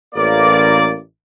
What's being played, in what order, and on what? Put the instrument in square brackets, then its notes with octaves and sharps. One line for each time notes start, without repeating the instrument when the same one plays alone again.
[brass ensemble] A1 A#3 D5